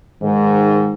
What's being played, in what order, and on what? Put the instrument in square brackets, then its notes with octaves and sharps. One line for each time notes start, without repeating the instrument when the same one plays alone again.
[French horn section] G#2 D#3